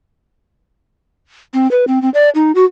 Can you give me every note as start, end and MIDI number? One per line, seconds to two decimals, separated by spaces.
1.54 1.70 60
1.71 1.85 71
1.87 2.01 60
2.02 2.10 60
2.14 2.29 74
2.35 2.52 63
2.55 2.65 66